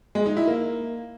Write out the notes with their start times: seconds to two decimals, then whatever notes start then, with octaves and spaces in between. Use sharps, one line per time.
0.15 G#3
0.26 D#4
0.37 E4
0.47 A#3